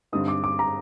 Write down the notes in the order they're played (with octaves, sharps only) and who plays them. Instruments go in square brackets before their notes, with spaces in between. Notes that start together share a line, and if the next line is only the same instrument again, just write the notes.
[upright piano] G2 D3 G3 C4 D#4 [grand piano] D#6
[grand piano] D6
D6
A#5